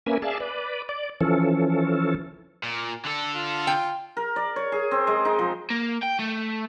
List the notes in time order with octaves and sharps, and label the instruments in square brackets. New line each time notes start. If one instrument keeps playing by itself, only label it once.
[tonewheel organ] A#3 C#4 A#4 B4 E5 G#5
G#4 D5 E5 F5 G#5 A5
B4 D5
D5
E3 F3 C#4 A4
[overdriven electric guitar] A#2
D3 A4
[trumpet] F4
[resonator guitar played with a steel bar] G5
[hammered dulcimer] A#4
D5
C#5
G#4
C4
G#3
D#4
F3
[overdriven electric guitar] A#3
G5
A3